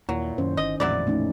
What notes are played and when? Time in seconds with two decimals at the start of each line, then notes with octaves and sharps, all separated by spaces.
0.09 D#2 A#2 F#3 E4
0.38 F#2 D#3 C#4 C5
0.57 G1 D#5
0.80 A1 F2 A#2 F#3 G#3 E4 D5
1.07 A3 C#4 D#4